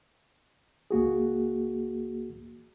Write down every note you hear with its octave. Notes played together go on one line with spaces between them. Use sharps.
C#2 A#3 F#4 G#4